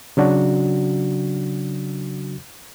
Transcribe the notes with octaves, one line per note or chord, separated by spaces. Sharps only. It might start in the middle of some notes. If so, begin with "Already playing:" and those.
C#3 F#3 D4 F#4